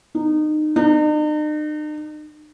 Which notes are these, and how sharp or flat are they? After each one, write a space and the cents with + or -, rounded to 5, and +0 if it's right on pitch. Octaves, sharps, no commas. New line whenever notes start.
D#4 -25
D#4 -45